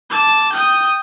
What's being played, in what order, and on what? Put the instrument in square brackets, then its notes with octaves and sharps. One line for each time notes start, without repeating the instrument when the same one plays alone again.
[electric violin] A5 D6
G5 D#6